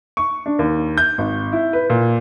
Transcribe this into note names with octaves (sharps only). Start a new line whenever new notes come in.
C#6
D4
D#2
G6
G#1
E4
B4
A#2